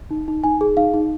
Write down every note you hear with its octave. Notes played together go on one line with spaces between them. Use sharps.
D#4
D#4
D#4 G#5
G#4
D#4 F5
D#4